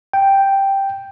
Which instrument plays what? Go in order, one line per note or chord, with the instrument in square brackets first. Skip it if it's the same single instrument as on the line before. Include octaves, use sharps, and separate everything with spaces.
[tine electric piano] G5